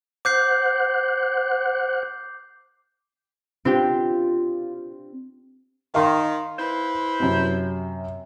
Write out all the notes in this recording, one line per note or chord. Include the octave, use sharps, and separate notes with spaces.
C5 F#5 D6 F#6 G6 C7
C4 D4 F4 G4
D#3 F5 C6
E4 B4 C5
F#2 C3